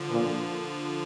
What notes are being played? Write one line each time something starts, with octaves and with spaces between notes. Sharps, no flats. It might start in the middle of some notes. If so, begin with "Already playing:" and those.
Already playing: D3 F3
A#2